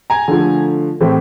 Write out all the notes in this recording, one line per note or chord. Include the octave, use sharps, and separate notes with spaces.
G#5 A#5
D3 F3 A3
A2 E3 A3 C4 E4